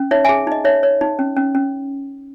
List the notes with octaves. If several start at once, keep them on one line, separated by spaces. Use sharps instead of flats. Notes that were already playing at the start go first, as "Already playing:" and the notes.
Already playing: C#4
D#4 C#5 E5
G#4 E5 G#5
D#4 D#5
D#4 C#5 E5
C#5
D#4
C#4
C#4
C#4